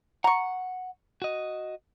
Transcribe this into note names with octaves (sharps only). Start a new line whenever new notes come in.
F#5 A#5 C#6
F#4 D#5